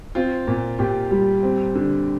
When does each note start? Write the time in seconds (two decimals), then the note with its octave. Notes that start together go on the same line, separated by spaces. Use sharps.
0.15 C4 F4
0.48 A#2
0.79 A#2 G4
1.11 G3
1.43 C4
1.75 D3